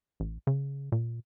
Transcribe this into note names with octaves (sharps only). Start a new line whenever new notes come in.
A1
C#3
A#2